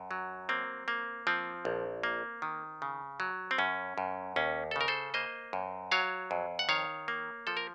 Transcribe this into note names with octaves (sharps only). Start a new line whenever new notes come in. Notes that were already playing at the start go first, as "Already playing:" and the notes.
Already playing: F#2
F#3
A#3 C4
A#3
F3 C4
A#1
A#3
D#3
C#3
F#3
C4
F#2 C#4
F#2
D#2 C#4
A4
C#3 A#4
A4 C5
A#3 C5 D#5
F#2
F#3 C#5 F5
F2
F#5
D#3 C#5 F5
A#3
F3 A4
A#4